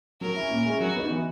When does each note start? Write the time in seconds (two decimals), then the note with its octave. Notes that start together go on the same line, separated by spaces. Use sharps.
0.21 F#3 A#4
0.36 C#4 E4
0.51 A#2
0.66 G#3 C#4 E4
0.80 F#3 F#4
0.96 B3 D#4
1.10 E3